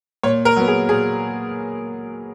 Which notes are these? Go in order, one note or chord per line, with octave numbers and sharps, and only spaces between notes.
A#2 C#5
A#4
F#3 B3
G#4
A#2 G#4